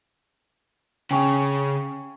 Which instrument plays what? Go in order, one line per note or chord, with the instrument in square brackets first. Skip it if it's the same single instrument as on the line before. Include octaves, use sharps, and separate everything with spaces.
[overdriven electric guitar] C#3 C#4 [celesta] G5 G#5 C#6